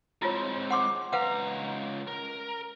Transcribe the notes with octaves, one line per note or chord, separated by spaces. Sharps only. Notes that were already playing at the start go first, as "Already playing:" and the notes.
G#3 C4 E4 F4 C#5
F#5 C6 D6
C#2 B4 F5 F#5 A#5
A#4